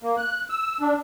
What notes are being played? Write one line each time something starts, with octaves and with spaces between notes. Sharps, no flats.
A#3
F#6
E6
D4